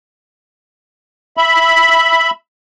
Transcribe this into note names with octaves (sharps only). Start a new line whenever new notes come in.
E5 B5